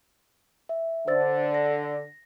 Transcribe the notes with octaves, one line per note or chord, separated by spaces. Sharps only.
E5
D3 C5 E6 A6
A#6